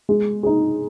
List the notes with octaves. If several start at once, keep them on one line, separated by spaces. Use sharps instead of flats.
G#3
D#4 G#4